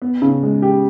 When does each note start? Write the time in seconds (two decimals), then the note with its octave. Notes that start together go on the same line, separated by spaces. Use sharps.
0.02 B3
0.22 C#3
0.43 G#3
0.62 G4